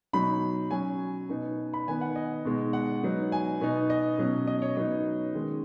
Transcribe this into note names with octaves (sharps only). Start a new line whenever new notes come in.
B2 F#3 D#4 B5
F#3 C#4 G#5
B2 B3 D#4
B5
D#3 B3 D#4 G#5
F#5
D#5
B2 G#3 D#4
F#5
F#3 B3 D#4
G#5
B2 B3 D#4
D#5
B2 F#3 C#4
D#5
C#5
F#3 B3 D#4 D#5
D#3 G#3 C#4